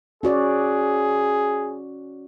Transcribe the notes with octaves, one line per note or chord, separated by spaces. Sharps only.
C#4 F#4 G#4 D5